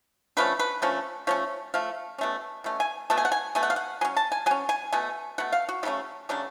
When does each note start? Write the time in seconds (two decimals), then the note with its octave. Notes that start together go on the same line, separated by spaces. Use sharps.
0.37 D3 F3 A3 C#4 B4
0.59 B4
0.82 D3 F3 A3 C#4
1.27 F3 A3 C#4 C#5
1.74 F3 A3 F5
2.18 B2 A3 C#4
2.64 B2 A3 C#4
2.80 G#5
3.10 B2 A3 A5
3.17 G#5
3.25 F#5
3.32 G#5
3.55 B2 A3 G#5
3.63 F#5
3.70 F5
3.76 F#5
4.01 F#3 C#4 G#5
4.17 A5
4.32 G#5
4.46 F#3 C#4 G#5
4.69 G#5
4.92 B2 A3 G#5
5.38 B2 A3 F#5
5.52 F5
5.69 F#4
5.83 C#3 F#3 A3 C#4 F4
6.29 C#3 F#3 A3 C#4 D4